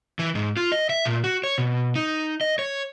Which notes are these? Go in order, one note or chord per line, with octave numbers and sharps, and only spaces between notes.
E3
G#2
F4
D#5
E5
A#2
F#4
C#5
B2
D#4
D#5
C#5